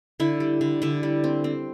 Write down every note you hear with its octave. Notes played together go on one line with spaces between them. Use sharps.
D3 E4
G3
D3
D3 E4
G3
C4
C4